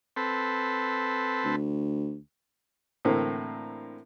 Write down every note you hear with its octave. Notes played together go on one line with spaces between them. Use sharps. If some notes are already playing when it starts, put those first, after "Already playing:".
C4 A4 B4
D2
A2 D3 E3 A#3 C4